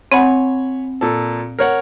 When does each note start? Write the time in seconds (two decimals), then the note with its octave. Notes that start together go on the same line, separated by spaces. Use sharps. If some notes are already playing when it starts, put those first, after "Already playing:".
0.12 C4 C#5 F#5 G#5 B5
1.01 A#2 A4
1.59 A#4 C#5 F#5